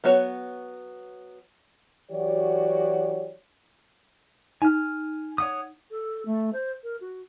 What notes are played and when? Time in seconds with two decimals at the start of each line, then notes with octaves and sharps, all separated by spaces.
0.04 F#3 B3 F#4 C#5
2.11 E3 F#3 F#4 G4 C#5 D5
4.62 D#4 G#5 F6
5.38 C#5 F#5 D#6
5.91 A4
6.26 A3
6.53 C5
6.84 A#4
7.01 F#4